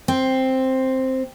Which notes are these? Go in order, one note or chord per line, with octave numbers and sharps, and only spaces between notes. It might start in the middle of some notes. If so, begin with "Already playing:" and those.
C4